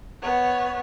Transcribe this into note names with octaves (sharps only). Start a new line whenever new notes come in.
B3 C#5